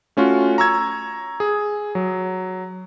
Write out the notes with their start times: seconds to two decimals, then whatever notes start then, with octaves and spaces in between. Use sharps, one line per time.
0.17 A3 C#4 F4 F#4
0.58 A#5 C#6 E6 G#6
1.40 G#4
1.95 F#3